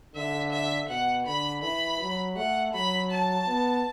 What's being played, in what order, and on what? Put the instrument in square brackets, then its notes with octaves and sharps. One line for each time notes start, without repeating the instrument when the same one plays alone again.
[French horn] D3 [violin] E5
[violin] E5
[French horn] B2 [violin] F#5
[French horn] D3 [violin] B5
[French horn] E3 [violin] B5
[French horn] F#3
[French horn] A3 [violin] F#5
[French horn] F#3 [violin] B5
[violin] A5
[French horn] B3